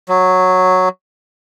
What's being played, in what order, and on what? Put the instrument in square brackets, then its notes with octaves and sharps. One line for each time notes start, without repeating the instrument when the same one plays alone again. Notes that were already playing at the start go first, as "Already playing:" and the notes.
[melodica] F#3